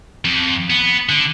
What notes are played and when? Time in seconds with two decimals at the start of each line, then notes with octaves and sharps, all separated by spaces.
0.25 F2
0.70 B3
1.09 D3